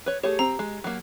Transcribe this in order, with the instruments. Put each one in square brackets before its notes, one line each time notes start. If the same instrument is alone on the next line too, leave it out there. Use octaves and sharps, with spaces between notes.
[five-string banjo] B4 C#5
[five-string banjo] A3 G#4 C#5 [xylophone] G4
[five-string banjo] C4 [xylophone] A#5
[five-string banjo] G#3
F#3 A#3